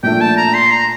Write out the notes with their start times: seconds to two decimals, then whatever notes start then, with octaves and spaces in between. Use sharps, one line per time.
0.03 A#2 F3 A3 D4 G5
0.21 A5
0.37 A#5
0.54 C6
0.71 A#5